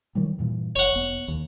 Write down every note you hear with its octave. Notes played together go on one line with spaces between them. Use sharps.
D#3 F#3 G3
G2 A#2 E3
F#1 C#5 F#5
F1 B3
D#2